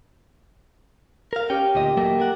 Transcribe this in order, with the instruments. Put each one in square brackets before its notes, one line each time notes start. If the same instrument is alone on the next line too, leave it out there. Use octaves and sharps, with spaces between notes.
[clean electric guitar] A#4 F5
[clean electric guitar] C#4 G5 [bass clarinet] G4
[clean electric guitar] D2 A#2 D#5
F#3 A3 A#3
A#4 F#5